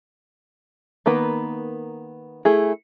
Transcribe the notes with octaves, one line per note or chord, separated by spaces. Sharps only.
D#3 A#3 B3 B4
A3 E4 G#4